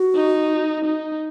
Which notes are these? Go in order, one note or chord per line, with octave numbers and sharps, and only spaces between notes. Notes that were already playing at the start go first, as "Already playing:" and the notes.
Already playing: F#4
D#4
D#4